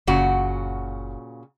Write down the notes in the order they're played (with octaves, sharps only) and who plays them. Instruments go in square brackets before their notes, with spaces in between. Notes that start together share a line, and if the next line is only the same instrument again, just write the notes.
[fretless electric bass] F#1 [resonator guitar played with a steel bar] A#2 C#3 F#4